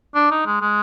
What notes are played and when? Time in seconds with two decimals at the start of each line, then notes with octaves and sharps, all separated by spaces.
0.15 D4
0.31 D#4
0.46 G#3
0.61 G#3